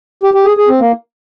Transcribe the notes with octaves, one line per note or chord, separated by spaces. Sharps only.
G4
G4
G#4
G#4
C4
A#3